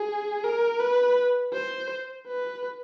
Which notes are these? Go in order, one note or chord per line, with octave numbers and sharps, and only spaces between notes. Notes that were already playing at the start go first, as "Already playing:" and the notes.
Already playing: G#4
A#4
B4
C5
B4